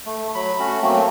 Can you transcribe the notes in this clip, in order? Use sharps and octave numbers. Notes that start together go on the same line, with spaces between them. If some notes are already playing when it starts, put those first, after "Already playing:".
A3
F#3 B5
A3 C#4 F#4
F#3 A3 A#3 C4